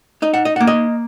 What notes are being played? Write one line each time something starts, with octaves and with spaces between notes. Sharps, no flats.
D#4 D#5
F#5
D#5
A#3 F#5
D#5